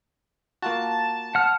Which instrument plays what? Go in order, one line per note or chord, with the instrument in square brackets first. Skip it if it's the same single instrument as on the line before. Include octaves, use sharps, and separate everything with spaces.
[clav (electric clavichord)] A#3 F4 F#4 [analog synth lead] A5
[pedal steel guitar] F#5 F6